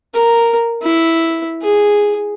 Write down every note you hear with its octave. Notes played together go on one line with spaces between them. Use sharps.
A#4
E4
G#4